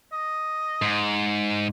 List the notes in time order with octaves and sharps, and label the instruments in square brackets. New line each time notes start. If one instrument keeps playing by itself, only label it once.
[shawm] D#5
[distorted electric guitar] G#2